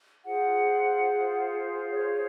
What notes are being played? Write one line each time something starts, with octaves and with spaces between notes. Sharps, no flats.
F4 G#4 C5 F#5
C#5